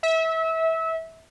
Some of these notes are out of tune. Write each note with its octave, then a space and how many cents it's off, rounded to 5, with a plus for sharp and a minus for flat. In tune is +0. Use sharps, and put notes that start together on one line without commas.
E5 -25